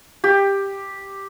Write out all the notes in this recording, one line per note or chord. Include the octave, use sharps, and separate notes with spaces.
G4